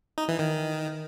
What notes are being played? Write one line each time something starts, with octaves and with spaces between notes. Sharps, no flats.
D#4
E3
D#3